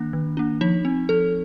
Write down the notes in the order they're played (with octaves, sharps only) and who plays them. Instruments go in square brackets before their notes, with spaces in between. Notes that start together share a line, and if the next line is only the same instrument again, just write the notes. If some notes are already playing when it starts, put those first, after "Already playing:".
Already playing: [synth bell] D#3 A#3 D4
D#3
A#3 D4
F3 D#4
C4
F3 A4